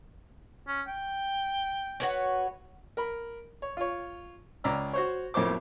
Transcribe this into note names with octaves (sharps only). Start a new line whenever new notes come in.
C#4
G5
F#4 B4 C#5
A#4 B5
C#5
F4 C#5
C#2 C#4 D5 A#5 E6
F#4 C5 C#5
B1 F2 A2 A#3 C5 D6